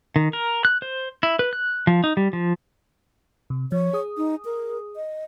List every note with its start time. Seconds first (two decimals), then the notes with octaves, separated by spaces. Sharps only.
0.16 D#3
0.33 A#4
0.65 F#6
0.82 C5
1.23 E4
1.39 B4
1.53 F#6
1.87 F3
2.04 D#4
2.17 G3
2.33 F3
3.50 C3
3.72 F3 C#5
3.93 G#4 D#6
4.17 D#4
4.45 A#4
4.96 D#5